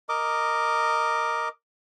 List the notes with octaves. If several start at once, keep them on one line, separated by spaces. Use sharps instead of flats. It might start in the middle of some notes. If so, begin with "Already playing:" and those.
A#4 D#5 D6